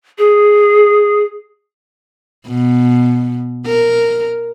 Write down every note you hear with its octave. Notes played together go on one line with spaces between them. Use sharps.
G#4
B2
A#4